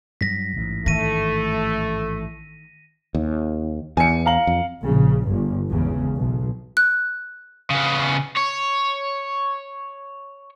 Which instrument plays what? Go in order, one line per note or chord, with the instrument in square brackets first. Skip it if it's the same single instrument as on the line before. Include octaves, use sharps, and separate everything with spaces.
[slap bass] G2 F#3 [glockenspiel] A#6 B6
[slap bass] A1 G#2
[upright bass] D#3 [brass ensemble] A3 [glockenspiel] A#6 D#7
[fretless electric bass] D#2
[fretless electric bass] E2 [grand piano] G#5 C#7
[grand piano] F5 A#5 F#7
[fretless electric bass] F2
[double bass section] A#1 C#3
G1 G2
G#1 E2 C#3
B1
[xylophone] F#6
[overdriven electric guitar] C#3 B3
C#5